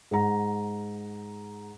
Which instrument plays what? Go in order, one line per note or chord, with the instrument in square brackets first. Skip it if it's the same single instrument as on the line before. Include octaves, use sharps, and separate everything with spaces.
[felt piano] G#2 F#5 A#5